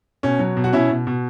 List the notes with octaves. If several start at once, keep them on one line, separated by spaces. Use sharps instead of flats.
B2 C#4
F#3
B2
F#4
B2 C#4 E4
B2
B2